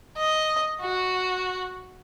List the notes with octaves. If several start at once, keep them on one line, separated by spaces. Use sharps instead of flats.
D#5
F#4